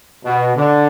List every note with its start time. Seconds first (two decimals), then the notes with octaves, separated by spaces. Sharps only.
0.24 B2
0.55 D3